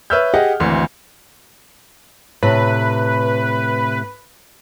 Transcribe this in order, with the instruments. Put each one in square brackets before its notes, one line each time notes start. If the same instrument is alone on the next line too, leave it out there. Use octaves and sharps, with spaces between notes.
[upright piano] B4 C#5 E5 E6 F6 G6
G4 G#4 D#5 F#5
G#1 D2 E3 C6
[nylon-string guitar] A2 C3 [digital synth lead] B4